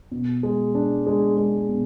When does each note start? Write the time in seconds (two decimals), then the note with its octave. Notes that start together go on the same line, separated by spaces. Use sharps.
0.11 B2
0.43 G#3
0.74 D4
1.06 G#3
1.37 G#3
1.69 B2